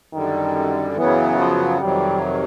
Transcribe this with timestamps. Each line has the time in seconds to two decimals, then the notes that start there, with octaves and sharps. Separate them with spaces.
0.13 F#2 D3 D#3 G3
0.97 F#2 C#3 E3 F#3 B3
1.39 F3
1.81 F2 C3 D#3 F#3 G3